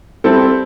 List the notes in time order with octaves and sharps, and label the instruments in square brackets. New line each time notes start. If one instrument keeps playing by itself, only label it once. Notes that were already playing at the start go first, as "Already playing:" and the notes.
[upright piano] G3 C4 E4 A4